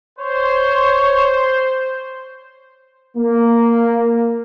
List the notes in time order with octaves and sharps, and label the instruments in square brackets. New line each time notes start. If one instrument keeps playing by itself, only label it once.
[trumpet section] C5 [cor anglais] C#5
[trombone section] A#3